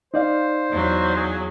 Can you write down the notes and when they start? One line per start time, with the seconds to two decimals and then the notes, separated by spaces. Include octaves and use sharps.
0.14 D#4 C5 D5 F5
0.71 E2 F#3
1.17 G#4